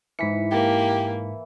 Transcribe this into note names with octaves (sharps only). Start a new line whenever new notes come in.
G#2 E3 B6 C#7
A#3 G4